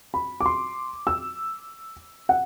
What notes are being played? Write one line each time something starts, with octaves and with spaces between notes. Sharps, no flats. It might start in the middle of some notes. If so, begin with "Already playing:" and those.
B5
D6
C6
E6
F#5